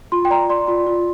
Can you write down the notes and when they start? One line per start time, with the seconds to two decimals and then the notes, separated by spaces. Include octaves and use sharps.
0.12 F4 C6
0.25 G5
0.30 D5 A#5
0.50 D5 C6
0.67 F4 C6
0.87 F4